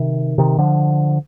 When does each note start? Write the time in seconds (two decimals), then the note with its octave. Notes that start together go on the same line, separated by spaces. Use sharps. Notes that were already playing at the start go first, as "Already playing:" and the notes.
Already playing: C3 D#3
0.38 C3 D#3
0.58 D3 F3